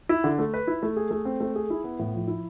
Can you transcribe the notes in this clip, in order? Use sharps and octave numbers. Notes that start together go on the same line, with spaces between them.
E4
D3
A3
B4
E4
A3
G#4
A3
C4
A3
G#4
E4
B3
A2
F3
E4